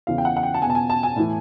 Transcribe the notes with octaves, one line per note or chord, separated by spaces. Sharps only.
E2 C#3 E3 F5
G5
F#5
F#5
G5
A5
E2 B2 G#5 A5
G#5
A5
G#5
A2 E3